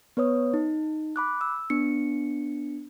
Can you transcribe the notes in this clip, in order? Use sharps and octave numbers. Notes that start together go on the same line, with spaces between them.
B3 B4 C#5 D#6
D#4
B5 D6 F#6
E6
B3 D4 C#7